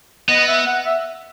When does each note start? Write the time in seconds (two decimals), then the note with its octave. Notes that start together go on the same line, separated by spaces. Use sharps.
0.29 B3 D#5
0.48 E5
0.66 F#5
0.85 E5